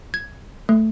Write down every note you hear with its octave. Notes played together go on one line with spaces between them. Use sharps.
G#6
A3